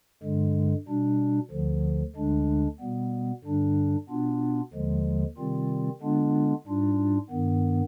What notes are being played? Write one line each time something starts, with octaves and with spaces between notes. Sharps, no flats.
G2 D3 G#3
B2 G3 D4
D2 D3 F3
D2 D3 G#3 D4
B2 G3 B3
G2 D3 G3 D4
B2 B3 D4 F4
D#2 D3 F3 G#3
C3 D#3 G3 C4 F4
D3 G#3 B3 D4 F4
G#2 G3 D4 F4
G2 D#3 B3